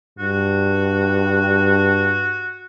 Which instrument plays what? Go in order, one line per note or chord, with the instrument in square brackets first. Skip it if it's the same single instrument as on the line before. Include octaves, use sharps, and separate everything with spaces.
[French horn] G2 [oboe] F#4